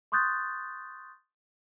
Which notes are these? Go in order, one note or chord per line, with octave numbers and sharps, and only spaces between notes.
C6 C#6 D#6 F#6 G6 A6